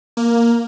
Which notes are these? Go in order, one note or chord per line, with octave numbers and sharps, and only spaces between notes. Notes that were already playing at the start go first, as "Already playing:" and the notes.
A#3